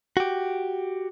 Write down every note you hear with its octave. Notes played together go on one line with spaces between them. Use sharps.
F#4 G4